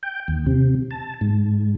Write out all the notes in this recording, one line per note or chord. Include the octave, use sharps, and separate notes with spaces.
G5
D#2
C3
A5
G#2